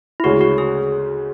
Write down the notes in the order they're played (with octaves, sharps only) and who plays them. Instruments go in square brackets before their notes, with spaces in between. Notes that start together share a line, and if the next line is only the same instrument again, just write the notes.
[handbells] E4
[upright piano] D2 C#3 G#3 C#4 [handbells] F#4
[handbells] F#4
G#4